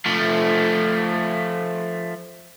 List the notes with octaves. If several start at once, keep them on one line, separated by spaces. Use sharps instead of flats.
F3 A3